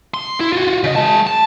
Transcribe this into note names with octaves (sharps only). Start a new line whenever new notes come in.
C6
E4
F4 F#4
C#3 D#5
G#3 A5
A5